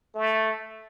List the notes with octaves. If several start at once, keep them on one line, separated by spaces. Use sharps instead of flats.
A3